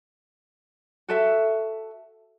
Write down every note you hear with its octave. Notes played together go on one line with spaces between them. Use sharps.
F#4 A4 E5